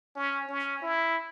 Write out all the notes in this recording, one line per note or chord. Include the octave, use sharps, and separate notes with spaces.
C#4
C#4
E4